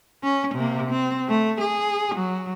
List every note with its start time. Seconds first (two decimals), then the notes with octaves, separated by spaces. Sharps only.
0.23 C#4
0.55 C3 A#3
0.91 C4
1.29 A3
1.61 G#4
2.15 F#3